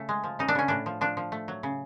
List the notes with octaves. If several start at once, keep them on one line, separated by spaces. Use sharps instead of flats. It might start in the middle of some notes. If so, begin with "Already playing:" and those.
Already playing: C#3 A3
G#3
F3
C#3 D#4
D4
C#3 C#4
A2 D4
F3
F3 D4
F3
A3
F#3
C#3